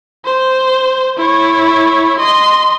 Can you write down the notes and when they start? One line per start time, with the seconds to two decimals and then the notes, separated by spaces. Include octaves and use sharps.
0.25 C5
1.17 E4 C#5
2.19 D#5 C6